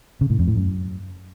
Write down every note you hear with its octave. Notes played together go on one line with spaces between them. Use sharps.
C#3
A2
F2
A2
F#2